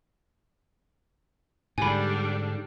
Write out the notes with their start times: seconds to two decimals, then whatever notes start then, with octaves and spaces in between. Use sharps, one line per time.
1.78 G#2 D3 G3 D4 G#5 B5